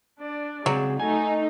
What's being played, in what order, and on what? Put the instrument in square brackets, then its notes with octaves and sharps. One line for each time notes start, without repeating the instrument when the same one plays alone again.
[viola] D4 D5
[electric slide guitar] C#3 G#3 C4 [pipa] F#3 [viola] G#4
[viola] A3 [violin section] D#4 [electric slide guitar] G#5